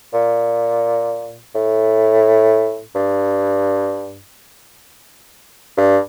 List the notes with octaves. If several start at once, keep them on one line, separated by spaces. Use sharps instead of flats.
A#2
A2
G2
G2